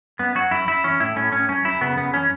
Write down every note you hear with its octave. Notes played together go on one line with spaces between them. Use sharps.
F#2 B3
F#3 F#4
F#2 E4
F#2 E4
E3 C#4
A2 E4
A2 C#4
A2 C#4
F#2 C#4
F#2 E4
C#3 B3
F#2 B3
E3 C#4